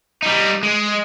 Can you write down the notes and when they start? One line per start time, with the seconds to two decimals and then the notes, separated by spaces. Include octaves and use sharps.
0.23 G3 D#4
0.63 G#3